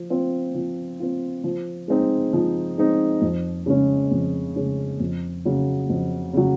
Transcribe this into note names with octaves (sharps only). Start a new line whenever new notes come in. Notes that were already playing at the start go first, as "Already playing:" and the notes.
Already playing: F3
C4 F4
F3
C4 F4
F3
G#3 C4 D#4
F3
G#3 C4 D#4
F2
C#3 G#3 C#4
F2
C#3 G#3 C#4
F2
C#3 F#3
F2
C#3 F#3